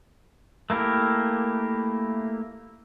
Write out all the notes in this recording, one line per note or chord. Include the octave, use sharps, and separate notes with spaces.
A3 A#3 E4 G4 A#4